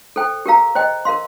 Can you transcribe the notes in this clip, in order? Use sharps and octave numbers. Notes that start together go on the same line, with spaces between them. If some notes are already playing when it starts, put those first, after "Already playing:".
A4 C5 G5
G4 A#4 F5 A#5
C5 D#5 G5
A#4 F5 C6